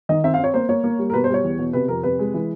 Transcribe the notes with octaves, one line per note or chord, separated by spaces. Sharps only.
D#3 D#5
C4 E5
F5
C4
C#5
A#3 C5
A#3 C#5
A#3
G3
A#4
B2 B4
C5
G3 C#5
E2
B2
C3 B4
F2 A#4
C3 B4
G#3
E3